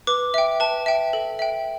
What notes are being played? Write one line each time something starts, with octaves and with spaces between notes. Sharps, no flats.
B4 D6
E5 G5
B4 A5
E5 G5
A4
E5 G5